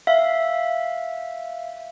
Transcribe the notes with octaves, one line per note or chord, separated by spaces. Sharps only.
E5 F5